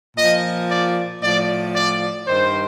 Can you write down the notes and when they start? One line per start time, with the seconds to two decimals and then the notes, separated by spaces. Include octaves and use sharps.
0.17 A#2 F3 D#5
0.70 D5
1.22 A2 F3 D5
1.76 D5
2.27 G2 D#3 C5